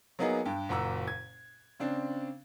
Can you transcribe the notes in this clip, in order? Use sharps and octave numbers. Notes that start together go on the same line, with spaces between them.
F#3 A#3 B3 D#4 G#4
G2 G5
F#1 A#2 F#5 A#5 E6
G#6
C#3 C4 D4